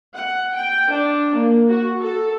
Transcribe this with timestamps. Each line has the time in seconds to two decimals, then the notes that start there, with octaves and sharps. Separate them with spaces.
0.16 F#5
0.55 G5
0.93 D4
1.34 A#3
1.69 F#4
2.02 A4